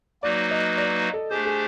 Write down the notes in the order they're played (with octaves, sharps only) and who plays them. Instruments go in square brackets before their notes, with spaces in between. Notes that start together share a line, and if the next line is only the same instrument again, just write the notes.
[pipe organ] F#3 A#3 D#4 F#4 B4 [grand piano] D5
[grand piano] D#5
D5
A4
[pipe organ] A3 D4 G4 C5 [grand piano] G#4
[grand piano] G#4